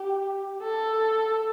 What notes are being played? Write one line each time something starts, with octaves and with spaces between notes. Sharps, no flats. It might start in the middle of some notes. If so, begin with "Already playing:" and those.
Already playing: G4
A4